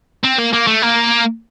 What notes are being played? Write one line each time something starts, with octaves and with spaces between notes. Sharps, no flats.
C4
A#3
A#3
A3
A#3